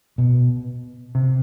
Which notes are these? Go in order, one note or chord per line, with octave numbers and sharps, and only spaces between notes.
B2
C3